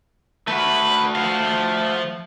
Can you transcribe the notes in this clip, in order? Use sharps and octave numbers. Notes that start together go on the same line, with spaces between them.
A3 F#4 B4
F3 F5